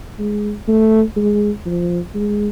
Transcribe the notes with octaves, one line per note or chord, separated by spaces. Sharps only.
G#3
A3
G#3
F3
G#3